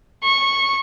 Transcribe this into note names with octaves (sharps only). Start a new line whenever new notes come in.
C#6